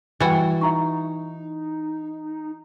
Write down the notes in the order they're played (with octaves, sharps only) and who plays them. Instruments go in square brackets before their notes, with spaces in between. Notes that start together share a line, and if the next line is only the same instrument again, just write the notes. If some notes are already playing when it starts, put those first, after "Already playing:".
[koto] E3 F#4 [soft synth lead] G3 [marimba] G5 A6
[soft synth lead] D#4 [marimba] E5 A#5 C#6